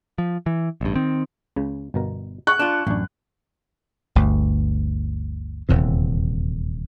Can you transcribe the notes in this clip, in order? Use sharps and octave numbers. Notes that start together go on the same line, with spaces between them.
F3
E3
A1 G2
D#3 C4
C#2 C#3
G1 B2 A#4
G#4 F#5 C#6 F#6
D4 F4
A1 F#2 D4
G1 D2
D#1 E2 C3